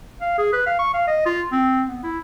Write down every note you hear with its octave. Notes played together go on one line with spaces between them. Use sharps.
F5
G#4
B4
F5
C#6
F5
D#5
F4
C4
B3
E4